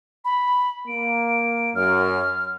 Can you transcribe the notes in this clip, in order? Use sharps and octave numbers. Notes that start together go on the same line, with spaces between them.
B5
A#3 D7
F#2 F6